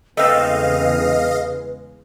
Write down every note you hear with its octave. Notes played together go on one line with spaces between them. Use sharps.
E2 C#3 G#3 A3 C4 B4 D#5 F5